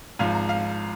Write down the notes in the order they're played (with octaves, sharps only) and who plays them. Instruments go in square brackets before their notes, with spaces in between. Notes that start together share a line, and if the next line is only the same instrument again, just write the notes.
[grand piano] G#1 G#2 F3 F5
A#5
F5